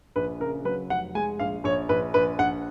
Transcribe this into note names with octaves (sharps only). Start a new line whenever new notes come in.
A#1 B4
C#3 A#4
F#3 B4
F1 F#5
G#3 G#5
A#1 F5
A#1 C#5
A#1 B4
A#1 B4
A#1 F#5